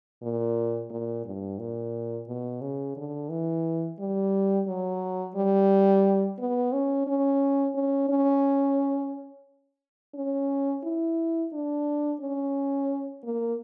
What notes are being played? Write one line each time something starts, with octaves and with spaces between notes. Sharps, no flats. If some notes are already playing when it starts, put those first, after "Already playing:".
A#2
A#2
G2
A#2
B2
C#3
D3
E3
G3
F#3
G3
B3
C#4
C#4
C#4
C#4
C#4
E4
D4
C#4
A#3